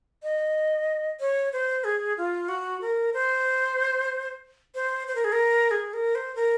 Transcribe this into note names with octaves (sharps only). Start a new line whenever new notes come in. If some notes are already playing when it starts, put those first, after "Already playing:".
D#5
C#5
C5
G#4
F4
F#4
A#4
C5
C5
C5
A#4
G#4
A#4
G#4
A#4
C5
A#4